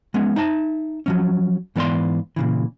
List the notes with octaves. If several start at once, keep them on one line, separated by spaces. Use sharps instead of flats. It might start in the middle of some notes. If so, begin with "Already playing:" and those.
G#3 B3 C#4
D#4 E5 A5
F3 F#3 C#4
G#2 E3 B3 D5 F5 C6
A#2 C#3 E3